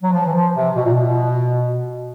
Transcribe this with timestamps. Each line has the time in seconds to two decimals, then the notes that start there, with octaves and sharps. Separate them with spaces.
0.02 F#3
0.11 F3
0.25 E3
0.33 F3
0.54 C3
0.76 B2
0.84 A#2
0.93 B2